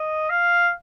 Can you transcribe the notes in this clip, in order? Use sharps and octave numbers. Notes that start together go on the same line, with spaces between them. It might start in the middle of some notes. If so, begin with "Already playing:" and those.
Already playing: D#5
F5